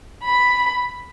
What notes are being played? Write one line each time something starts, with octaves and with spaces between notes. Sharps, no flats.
B5